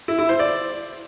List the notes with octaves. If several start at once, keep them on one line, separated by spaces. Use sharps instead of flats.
E4
E4
C5
D5